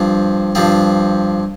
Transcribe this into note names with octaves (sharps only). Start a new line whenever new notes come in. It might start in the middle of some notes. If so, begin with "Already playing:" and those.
Already playing: G2 F3 C4
G2 F3 C4